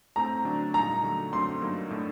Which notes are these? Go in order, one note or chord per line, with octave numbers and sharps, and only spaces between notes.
A2 A3 C4 A#5
D3 F#3 A3 D4
A#2 G3 A#3 D#4 A#5
D3 F#3 A3
F#2 D3 F#3 A3 C4 C6
G2 F#3 A#3 D#4
A2 A3 D4